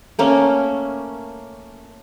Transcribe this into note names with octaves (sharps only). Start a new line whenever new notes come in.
A3 A#3 C#4